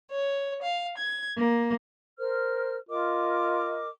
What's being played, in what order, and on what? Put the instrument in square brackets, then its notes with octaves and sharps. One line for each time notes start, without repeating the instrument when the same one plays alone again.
[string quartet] C#5
F5
G#6
A#3
[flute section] A#4 C5 F6
[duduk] F4 [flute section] A#4 D#5 D6